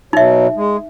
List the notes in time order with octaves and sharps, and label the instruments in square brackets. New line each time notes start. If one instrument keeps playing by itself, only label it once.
[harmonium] B2 F#3 [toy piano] D#4 E5
[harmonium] G#3